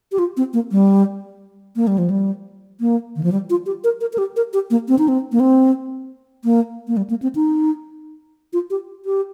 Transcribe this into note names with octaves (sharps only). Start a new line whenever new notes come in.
G4
F4
C4
A#3
G3
A#3
G3
F3
G3
A#3
D#3
F3
G3
F4
G4
A#4
A#4
A#4
G4
A#4
G4
A#3
C4
D#4
C4
A#3
C4
A#3
A#3
G3
A#3
C4
D#4
F4
G4
G4